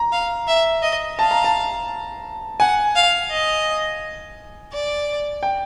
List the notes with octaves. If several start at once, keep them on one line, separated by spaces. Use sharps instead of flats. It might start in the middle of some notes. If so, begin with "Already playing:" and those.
Already playing: A#5
F5
E5
D#5
F5 A5
A#5
A5
F#5 G#5
F5
D#5
D5
G5